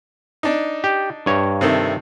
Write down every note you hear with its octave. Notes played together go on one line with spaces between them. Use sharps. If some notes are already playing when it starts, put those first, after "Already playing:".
D4 D#4
G4
G2 C#5
C3 D#3 A3